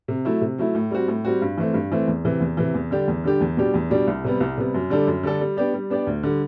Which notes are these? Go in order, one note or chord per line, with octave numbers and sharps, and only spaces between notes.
C3
F#3 A3 E4
C3
F#3 A3 E4
A2
G3 C4 F#4
A2
G3 C4 F#4
G2
E3 A3 C4
G2
E3 A3 C4
E2
C3 E3
E2
C3 E3
E2
D3 G3 D4 G4
E2
D3 G3 D4 G4
E2
B2 G3 D4 G4
E2
B2 G3 D4 G4
C2
C3 G3 B3
C2
C3 G3 B3
F#2
D3 G3 D4 A4
F#2
D3 G3 D4 A4
G3
B3 D4 G4 D5
G3
B3 D4 G4 D5
D2
D3 G3